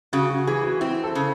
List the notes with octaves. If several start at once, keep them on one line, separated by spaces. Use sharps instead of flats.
C#3 F#4
F#4
E3 G#4
F#4
C4 E4
A4
C#3